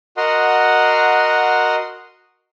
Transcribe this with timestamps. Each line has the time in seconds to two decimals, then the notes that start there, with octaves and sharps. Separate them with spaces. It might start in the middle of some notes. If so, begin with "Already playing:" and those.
0.17 F#4 A#4 D#5 F#5 C6